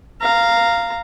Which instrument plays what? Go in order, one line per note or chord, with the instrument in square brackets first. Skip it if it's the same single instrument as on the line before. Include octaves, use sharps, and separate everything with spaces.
[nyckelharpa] F5 A#5